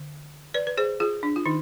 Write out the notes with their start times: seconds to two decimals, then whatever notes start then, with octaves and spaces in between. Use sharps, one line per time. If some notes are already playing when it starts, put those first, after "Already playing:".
Already playing: D3
0.54 B4 D5
0.67 B4
0.77 G#4 C5
1.00 F4 G#4
1.23 D4
1.36 F4
1.46 D#3 D#4